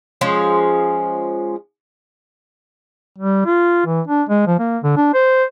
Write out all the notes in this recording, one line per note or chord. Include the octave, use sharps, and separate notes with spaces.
F3 G#3 C#4
G3
F4
E3
D4
G#3
F3
A#3
D3
D4
C5